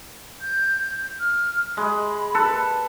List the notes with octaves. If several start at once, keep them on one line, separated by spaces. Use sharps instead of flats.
G6
F6
G#3 B5
A4 B4